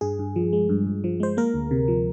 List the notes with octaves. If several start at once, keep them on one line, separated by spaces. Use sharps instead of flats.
G2 G#4
G2
F3
G#3
G2
G2
F3
G#3 C5
A#3 A#4
D2
C3
F3